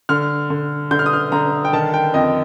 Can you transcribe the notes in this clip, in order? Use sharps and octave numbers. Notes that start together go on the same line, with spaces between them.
D3 F6
D3
D3 G6
F6
D#6
F6
D3 A#5
G5
D#3 A5
G5
F2 D#5